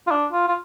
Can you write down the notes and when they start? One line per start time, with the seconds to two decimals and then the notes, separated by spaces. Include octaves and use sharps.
0.07 F4
0.11 D4
0.32 F4
0.48 F4